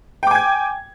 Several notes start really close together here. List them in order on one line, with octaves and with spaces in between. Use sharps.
G5 D6 G#5 G#6